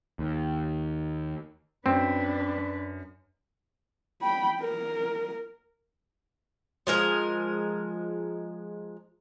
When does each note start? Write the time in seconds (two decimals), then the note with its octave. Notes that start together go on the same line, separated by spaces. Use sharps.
0.19 D#2
1.86 F#2 C4 D4 B4
4.22 G5 B5
4.61 A#4
6.87 F3 G#3 A#4